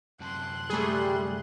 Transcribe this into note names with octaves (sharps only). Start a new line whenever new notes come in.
F#2 C3 A5 C6 F#6
G3 A3 G#4